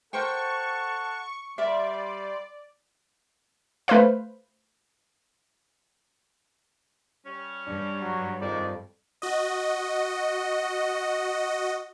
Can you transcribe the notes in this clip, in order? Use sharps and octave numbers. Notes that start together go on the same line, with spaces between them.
A4 A#4 C5 F#5 G5 A5 C#6
G3 A#4 D5 E5 C6
A3 B4 C5 F5
G3 C#4
G2 D4
F#3
F2 G#2 D#3 D5
F#4 D#5